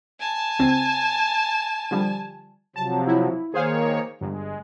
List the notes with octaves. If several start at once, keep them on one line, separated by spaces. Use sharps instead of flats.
G#5 A5
C#2 C4 G#6
D3 F3 G3
C3 F3 F#3 A5
E4
D#3 A#3 G#4 C5 C#5 F5
G1 G#3